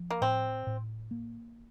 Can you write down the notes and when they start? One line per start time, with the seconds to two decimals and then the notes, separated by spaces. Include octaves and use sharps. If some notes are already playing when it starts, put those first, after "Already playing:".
Already playing: F3
0.10 A#3
0.21 A2 C4
0.67 A2
1.11 A#3